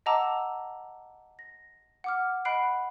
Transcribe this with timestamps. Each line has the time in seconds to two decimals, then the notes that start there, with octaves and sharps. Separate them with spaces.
0.06 D#5 F#5 A5 A#5 D6 E6
1.39 A#6
2.04 F#5 D6 F6
2.45 D#5 F#5 B5 F#6 C7 D7